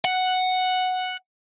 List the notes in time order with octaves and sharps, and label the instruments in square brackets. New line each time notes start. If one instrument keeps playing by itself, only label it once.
[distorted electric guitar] F#5